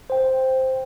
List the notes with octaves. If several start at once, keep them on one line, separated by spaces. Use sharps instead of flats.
C5 G5